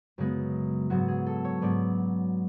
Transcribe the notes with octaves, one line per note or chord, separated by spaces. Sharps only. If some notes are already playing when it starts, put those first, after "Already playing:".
F#2 C#3 G#3 B3
G#2 F#3 B3 F#4
G#4
A4
C#5
G#2 F#3 B3 D5